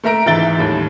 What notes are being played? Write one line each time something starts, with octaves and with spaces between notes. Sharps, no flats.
A3 A#4 E5 A#5 D7
C#2 G#2 E3 E5 A6 G7
D#2 A2 G3